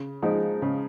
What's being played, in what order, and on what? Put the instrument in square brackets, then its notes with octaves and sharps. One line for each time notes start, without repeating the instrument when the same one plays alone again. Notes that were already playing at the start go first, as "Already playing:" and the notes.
Already playing: [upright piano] C#3
F3 G#3 D#4
C#3